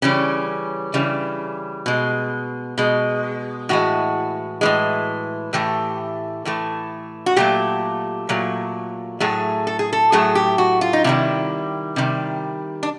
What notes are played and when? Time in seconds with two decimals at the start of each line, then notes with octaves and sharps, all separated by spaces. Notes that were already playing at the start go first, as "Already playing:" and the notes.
0.02 C#3 E3 G3 C#4
0.94 C#3 E3 G3
1.86 B2 G#3
2.78 B2 G#3
3.69 A2 E3 G#3 F#4
4.61 A2 E3 G#3
5.53 A2 E3 A3 G4
6.45 A2 E3 A3
7.26 F#4
7.36 A#2 F#3 A3 G4
8.29 A#2 F#3 A3
9.20 A2 F#3 A3 G#4
9.67 A4
9.79 G#4
9.93 A4
10.12 A2 F#3 A3 G#4
10.35 G4
10.58 F#4
10.81 F4
10.93 D#4
11.04 C3 D#3 G3 E4
11.96 C3 D#3 G3
12.83 D4